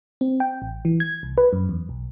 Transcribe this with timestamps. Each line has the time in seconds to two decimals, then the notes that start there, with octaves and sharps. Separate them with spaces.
0.21 C4
0.40 G5
0.62 A1
0.85 E3
1.00 G#6
1.23 C2
1.38 B4
1.53 F#2
1.69 E2
1.89 B1